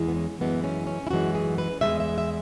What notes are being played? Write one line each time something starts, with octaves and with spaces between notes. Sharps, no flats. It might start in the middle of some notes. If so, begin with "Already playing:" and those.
Already playing: E2 E3 G#3
B3
C#4
F#2 E3 G#3 B3
C#4
C#4
E4
F#2 E3 G#3 F#4
G#4
B4
E2 E3 G#3 E5
E5
E5